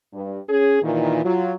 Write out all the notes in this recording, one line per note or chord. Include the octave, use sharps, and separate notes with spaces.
G2
C#4 G#4
A#2 D#3 E3
F#3 F4